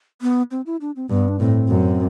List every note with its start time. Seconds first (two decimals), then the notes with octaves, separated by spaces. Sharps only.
0.22 B3
0.51 C4
0.66 E4
0.81 D4
0.96 C4
1.10 G2 B3
1.28 D4
1.40 A2 C4
1.69 F#2